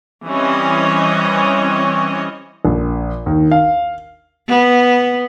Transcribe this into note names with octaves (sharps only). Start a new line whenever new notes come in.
E3 G3 C4 C#4 C#5 D#5
A#1
D#2
F5
B3